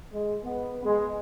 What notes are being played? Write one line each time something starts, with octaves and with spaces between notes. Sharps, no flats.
G#3
B3
G#3